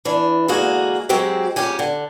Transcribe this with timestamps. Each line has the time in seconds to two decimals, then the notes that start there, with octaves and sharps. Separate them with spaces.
0.05 E3 D4
0.48 D3 G#3 A#3 F#4 G#4
1.09 F#3 G#3 C4 F#4 G4
1.56 F2 G#2 C#4 G4 G#5
1.79 D3